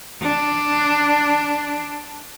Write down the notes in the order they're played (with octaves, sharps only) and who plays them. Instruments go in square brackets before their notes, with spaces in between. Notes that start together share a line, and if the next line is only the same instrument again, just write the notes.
[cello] D4